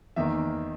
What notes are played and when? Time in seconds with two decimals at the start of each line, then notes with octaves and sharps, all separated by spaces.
0.16 E2 D#3 A#3 E5